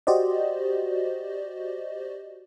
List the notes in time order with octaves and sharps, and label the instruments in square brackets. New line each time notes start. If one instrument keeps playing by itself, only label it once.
[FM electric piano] F#4 G4 C5 D5 D#5